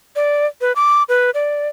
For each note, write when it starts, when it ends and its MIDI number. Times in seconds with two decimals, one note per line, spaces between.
0.16 0.46 74
0.61 0.73 71
0.76 1.03 86
1.09 1.31 71
1.34 1.68 74